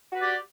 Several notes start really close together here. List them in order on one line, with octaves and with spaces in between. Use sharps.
F#4 B4 D5 G4